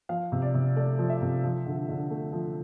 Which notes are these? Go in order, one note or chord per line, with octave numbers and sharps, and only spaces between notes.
F3 F5
C3
D5
C3
A3 D5
F3
E5
C3
F3
D3
D3
A3
F3